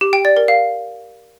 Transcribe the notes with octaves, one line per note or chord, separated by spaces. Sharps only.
G4
G5
D5
A#4
F5